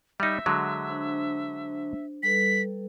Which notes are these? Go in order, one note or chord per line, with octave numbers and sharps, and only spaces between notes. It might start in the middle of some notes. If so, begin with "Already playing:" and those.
G3 D#4 E5
D3 F#3 G#3
D4 C5
G3 A4 B4 B6